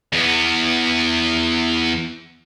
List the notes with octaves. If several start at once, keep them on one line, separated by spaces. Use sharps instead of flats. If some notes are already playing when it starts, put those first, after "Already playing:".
E2 B3